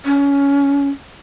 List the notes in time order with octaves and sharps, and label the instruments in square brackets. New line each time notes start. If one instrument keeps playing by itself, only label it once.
[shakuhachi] C#4